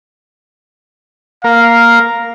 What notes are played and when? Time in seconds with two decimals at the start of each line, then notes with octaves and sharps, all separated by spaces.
1.44 A#3 A#4 F5